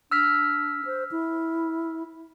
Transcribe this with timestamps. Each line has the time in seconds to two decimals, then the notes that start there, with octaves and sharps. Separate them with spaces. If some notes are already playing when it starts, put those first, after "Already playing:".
0.11 D4 E6 F6 B6
0.85 C5
1.12 E4